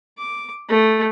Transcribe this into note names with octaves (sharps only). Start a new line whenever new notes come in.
D6
A3